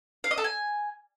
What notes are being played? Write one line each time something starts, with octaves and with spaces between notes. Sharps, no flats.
F5
D#5
A4
G#5